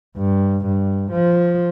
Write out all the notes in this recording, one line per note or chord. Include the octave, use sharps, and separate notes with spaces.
G2
G2
F3